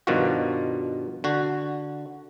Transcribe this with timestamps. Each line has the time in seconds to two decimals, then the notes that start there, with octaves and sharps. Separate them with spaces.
0.07 G2 B2 D#3 F3 F4 F#4
1.24 D3 F#4